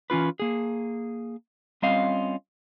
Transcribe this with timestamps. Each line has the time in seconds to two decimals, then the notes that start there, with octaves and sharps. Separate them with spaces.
0.10 E3 C#4 F4 B4
0.40 A#3 G#4
1.82 G3 C4 C#4 F4 D#5 F5